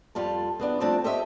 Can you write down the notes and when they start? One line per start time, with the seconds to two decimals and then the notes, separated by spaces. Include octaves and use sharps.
0.15 F2 G3 F4 A5
0.60 E2 B3 D4
0.80 F3 G3 A3 C4 D4 A5
1.04 G4 A4 C5 C#5 D#5 E5